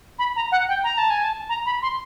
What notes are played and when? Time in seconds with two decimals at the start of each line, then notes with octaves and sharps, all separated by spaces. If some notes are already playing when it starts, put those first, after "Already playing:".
0.19 B5
0.36 A#5
0.52 F#5
0.69 G5
0.84 A#5
0.98 A5
1.10 G#5
1.24 A5
1.49 A#5
1.66 B5
1.82 C6